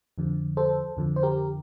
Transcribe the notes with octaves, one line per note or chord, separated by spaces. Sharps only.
F2 D3 F3
A4 C5
F2 D3 F3
C5
G4 A#4